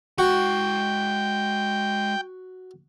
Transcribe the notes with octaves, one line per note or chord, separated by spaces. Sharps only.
G#3 F#4 F#5 G5